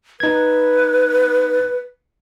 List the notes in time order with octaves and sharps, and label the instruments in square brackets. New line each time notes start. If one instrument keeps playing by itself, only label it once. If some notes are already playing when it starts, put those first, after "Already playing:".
[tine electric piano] D#4 G#6 [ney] B4